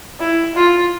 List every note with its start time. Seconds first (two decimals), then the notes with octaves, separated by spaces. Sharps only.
0.20 E4
0.55 F4